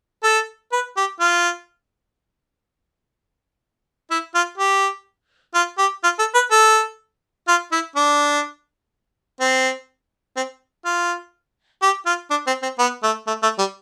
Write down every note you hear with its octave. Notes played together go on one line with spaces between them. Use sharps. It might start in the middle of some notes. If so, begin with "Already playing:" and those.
A4
B4
G4
F4
E4
F4
G4
F4
G4
F4
A4
B4
A4
F4
E4
D4
C4
C4
F4
G4
F4
D4
C4
C4
B3
A3
A3
A3
G3